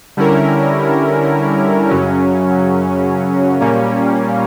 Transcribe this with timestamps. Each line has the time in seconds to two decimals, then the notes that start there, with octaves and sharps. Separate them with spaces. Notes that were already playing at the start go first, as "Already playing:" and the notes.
0.17 D3 G3 C#4 E4 A#4
1.89 F#2 C#3 F#3 C#4
3.60 A#2 G3 A#3 C#4